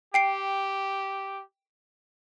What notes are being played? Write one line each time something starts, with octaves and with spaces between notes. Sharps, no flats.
G4 G5 C7 D7